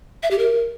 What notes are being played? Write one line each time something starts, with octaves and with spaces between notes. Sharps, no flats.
E5
G4
A#4